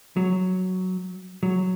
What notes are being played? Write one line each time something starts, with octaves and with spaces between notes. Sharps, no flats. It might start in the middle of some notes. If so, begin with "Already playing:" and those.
F#3
F#3